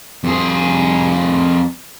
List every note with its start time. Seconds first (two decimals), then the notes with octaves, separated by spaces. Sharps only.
0.24 F2 G#4